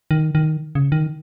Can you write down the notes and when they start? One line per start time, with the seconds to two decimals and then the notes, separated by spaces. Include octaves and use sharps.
0.11 D#3
0.35 D#3
0.75 C#3
0.92 D#3